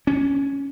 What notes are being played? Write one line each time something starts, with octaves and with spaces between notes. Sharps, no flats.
C#4